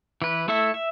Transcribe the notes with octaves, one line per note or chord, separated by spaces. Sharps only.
E3 B4
A3 E4 A4 E5
E5